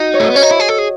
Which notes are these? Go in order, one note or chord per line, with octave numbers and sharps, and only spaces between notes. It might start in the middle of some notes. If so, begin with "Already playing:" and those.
Already playing: D#4 F#4
C#5
A3
B3 D#5
C#4 C#5
D#4
E4
G#4
A4
G#4